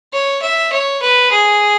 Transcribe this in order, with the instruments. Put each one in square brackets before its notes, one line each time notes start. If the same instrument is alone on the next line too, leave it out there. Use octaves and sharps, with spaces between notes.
[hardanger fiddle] C#5
E5
C#5
B4
G#4